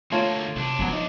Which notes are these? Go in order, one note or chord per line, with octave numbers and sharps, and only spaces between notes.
D2 A3 A#3 F4 C#5
E2 C3 D4
C#3 F3 F#3 G#3 B3
D#4